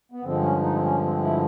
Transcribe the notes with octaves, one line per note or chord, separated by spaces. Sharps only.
B3
G2 D3 F3 G#3 C4
C#4
D#4
C4
C#4
C4
E4